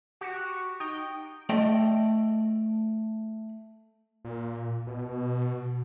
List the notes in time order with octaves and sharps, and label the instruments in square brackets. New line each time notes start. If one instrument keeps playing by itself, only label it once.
[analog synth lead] F#4 [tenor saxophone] G4
[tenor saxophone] D#4 [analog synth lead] G5
[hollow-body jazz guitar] A3 D5 D#5 G5
[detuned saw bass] A#2
B2